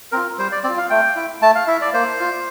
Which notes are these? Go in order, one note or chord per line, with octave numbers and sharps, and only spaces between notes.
C4 F4 A#4
G3 C5
D5
C4 D5
F4
F5
A3 G5
E4
A3 A5
F5
E4 E5
D5
A#3 C5
F4